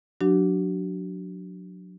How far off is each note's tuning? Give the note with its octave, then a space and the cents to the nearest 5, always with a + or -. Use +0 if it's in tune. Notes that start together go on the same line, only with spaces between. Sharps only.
F#3 -25 D4 +0 F#4 +40